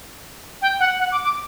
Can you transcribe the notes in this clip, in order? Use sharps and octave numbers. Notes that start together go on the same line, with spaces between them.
G5
F#5
F#5
D6
D6